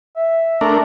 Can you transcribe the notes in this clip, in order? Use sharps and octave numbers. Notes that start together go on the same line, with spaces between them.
E5
A3 D4 A#4